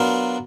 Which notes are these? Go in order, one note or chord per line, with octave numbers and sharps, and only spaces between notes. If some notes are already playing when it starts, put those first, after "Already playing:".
Already playing: F#3 B3 D4 F4 A#4